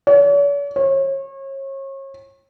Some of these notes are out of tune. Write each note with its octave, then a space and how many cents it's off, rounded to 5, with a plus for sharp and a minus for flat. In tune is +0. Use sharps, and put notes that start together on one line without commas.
C#5 +45
C#5 -35